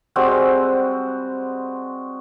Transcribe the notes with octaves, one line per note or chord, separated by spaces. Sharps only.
G3 G#3 C4 F#4